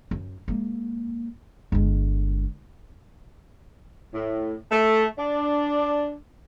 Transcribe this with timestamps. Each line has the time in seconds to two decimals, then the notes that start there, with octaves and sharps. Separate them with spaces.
0.11 F#2
0.48 G#3 A#3
1.72 G1 G#3
4.14 A2
4.71 A3
5.18 D4